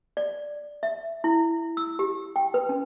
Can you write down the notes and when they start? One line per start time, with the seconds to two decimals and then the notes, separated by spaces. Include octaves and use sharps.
0.17 D5
0.83 E5
1.24 E4
1.77 E6
1.99 G4
2.36 G5
2.54 B4
2.69 C#4